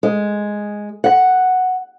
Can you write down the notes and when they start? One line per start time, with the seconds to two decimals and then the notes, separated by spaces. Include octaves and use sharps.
0.03 G#3
1.04 F#5